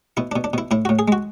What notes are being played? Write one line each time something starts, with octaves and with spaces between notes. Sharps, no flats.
B2 E4
D4
B2
D4
B2 E4
A2 E4
A2 F#4
G#4
G#3 F#4